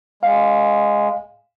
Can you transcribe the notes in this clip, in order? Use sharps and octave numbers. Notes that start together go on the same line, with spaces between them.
G#3 F5